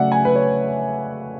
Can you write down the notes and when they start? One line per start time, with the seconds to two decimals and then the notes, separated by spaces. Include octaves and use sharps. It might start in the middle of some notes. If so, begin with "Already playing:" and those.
Already playing: C#3 F#3 A3 D5 E5 F#5
0.12 G#5
0.25 B4
0.35 C#5